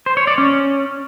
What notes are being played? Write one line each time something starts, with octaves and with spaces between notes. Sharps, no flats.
C5
C#5
D5
C#4